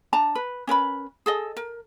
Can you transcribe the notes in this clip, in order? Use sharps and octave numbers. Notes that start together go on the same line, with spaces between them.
D4 A5 A#5
B4
C#4 A#4 B4 B5
G#4 A4 D#5
A#4